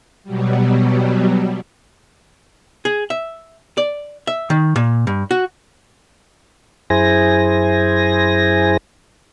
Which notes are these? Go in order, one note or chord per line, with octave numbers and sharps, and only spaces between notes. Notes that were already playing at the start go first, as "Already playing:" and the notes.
B2 F#3 G3
G#4
E5
D5
E5
D#3
A#2
G2
F#4
F#2 E4 G#4 C5 G#5 A#6